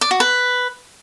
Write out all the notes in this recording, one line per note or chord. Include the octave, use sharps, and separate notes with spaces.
D5
F#4
B4